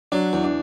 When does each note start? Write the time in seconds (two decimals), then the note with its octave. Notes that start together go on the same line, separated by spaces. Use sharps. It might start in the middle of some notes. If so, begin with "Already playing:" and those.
0.12 F#3 D4
0.33 E2
0.44 D4